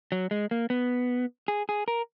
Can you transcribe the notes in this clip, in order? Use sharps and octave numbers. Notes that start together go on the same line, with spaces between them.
F#3
G#3
A#3
B3
G#4
G#4
A#4